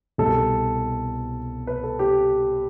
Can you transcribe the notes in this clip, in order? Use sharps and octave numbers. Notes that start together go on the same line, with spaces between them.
C2 B2 G3 A4
B4
A4
G4